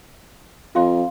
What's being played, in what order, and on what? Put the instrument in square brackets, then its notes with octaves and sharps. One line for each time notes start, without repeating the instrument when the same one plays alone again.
[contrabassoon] F2 [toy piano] F4 F5 C6